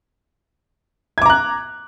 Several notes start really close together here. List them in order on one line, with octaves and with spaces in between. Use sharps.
G#6 D6 A#5 F#6